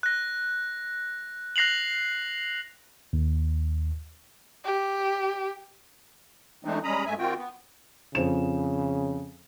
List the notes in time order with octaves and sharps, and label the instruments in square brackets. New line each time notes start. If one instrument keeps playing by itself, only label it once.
[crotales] F#6 A#6
F#6 A#6 C7 F7 F#7
[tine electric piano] D#2
[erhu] G4
[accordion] E3 G#3 A3 C4 D4 D#4
G3 G#3 C#4 A#5 B5 D#6
G2 G#3 A3 E5 G#5
D#3 C4 F4 F#4 G5
B3
[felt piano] F2 C5 E7 [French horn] C#3